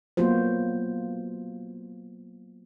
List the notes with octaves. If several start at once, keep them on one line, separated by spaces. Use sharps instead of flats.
F#3 A#3 B3 F4 F#4 C5